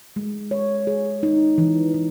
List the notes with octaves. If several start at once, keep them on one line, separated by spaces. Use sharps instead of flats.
G#3
C#5
G#4
D#4
E3
E3